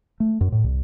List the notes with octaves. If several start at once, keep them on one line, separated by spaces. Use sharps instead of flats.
A3
F#2
A2
C2